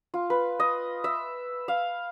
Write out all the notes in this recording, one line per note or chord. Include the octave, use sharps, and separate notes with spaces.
F4
B4
D#5
E5
F5